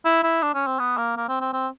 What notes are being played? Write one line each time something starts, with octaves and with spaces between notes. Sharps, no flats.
E4
E4
D4
C#4
C4
B3
A#3
A#3
C4
C4
C4